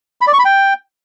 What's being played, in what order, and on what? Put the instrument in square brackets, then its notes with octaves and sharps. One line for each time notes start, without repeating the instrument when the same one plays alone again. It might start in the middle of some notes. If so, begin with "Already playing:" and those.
[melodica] B5
D5
C#6
B5
G5